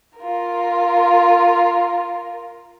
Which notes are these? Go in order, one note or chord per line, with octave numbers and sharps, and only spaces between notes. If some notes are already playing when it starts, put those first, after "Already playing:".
F4 A#4